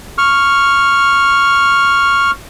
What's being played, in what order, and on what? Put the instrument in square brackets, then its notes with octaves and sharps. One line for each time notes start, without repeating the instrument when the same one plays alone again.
[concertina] C#6 F6